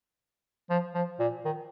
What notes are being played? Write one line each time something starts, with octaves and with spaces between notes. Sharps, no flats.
F3
F3
A#2
D#3